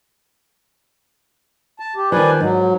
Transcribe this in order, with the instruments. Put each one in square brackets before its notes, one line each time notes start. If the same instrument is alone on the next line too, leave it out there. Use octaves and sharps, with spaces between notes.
[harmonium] A5
G4
[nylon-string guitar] D#3 F3 [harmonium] B4 D5 G#5
[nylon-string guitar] G#2 [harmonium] F#3